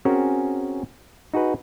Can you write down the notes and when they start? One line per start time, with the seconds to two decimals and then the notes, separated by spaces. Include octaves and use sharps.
0.05 C4 C#4 F#4 G#4 A#4
1.34 D#4 F#4 G#4 B4